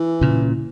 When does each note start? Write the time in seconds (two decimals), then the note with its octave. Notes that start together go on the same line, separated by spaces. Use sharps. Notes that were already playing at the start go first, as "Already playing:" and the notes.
Already playing: E3
0.21 A#2 C#3